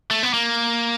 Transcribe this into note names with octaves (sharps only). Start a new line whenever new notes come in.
A3
B3
A#3